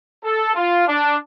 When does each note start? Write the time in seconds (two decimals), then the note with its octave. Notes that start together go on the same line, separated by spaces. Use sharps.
0.23 A4
0.55 F4
0.87 D4